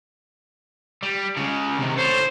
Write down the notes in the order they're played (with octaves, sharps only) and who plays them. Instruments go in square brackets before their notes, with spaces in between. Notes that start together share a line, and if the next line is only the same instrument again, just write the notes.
[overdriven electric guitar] G3
C#3 G#3
C3 D#3
[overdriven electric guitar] A4 C#5 [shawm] C5